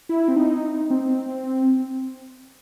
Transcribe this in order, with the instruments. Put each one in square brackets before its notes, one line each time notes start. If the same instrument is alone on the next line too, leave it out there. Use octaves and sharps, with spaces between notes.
[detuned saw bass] E4
C4
D#4
C4